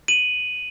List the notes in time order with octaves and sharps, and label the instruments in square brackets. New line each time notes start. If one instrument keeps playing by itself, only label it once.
[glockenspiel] D#7 F#7